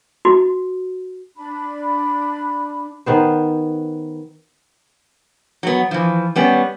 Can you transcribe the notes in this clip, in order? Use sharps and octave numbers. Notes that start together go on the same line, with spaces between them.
F#4
D4 B5
D#3 B3 C5
F#3 B3
E3 F3
G3 B3 C#4